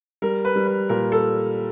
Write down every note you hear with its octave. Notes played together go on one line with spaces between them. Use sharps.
G3 A#4
B4
G3
B4
A#2 A#4
A4